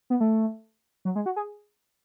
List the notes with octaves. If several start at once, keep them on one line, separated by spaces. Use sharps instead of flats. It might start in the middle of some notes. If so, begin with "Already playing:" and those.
B3
A3
F#3
G#3
F#4
G#4